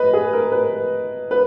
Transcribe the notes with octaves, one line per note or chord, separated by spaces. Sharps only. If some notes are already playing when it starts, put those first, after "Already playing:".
Already playing: B4 D#5
G#4
A#4
B4
B4